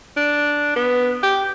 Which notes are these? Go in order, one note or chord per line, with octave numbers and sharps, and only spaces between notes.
D4
B3
G4